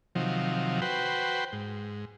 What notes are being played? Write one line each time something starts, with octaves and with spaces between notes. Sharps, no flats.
C3 D#3 F3 F#3
F#4 B4 C5 G5
G#2